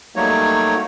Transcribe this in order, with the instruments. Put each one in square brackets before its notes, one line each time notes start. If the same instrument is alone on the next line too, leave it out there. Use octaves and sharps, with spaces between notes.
[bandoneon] F#3 G3 A3 A#3 D#4 C#5